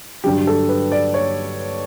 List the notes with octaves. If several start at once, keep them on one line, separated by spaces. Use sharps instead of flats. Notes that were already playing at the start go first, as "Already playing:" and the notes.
G2 D3 F#3 G4
A4
B4
D5
C#5